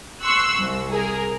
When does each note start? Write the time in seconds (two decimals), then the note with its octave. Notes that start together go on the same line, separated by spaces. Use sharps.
0.22 C6 C#6 E6 F#6
0.58 C2
0.91 G#4 A#4